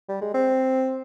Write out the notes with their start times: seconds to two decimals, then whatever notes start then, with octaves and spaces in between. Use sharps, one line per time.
0.09 G3
0.22 G#3
0.34 C4